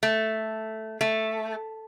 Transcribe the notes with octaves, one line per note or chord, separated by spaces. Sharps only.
A3
A3